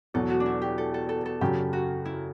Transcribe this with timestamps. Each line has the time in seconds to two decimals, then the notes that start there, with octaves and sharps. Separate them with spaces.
0.14 E2 B2 F#3 A4
0.30 F#4
0.40 D4
0.46 E4
0.62 G4
0.78 A4
0.94 A4
1.09 A4
1.26 A4
1.41 F#2 C#3 F#3 G4
1.73 F#4
2.05 E4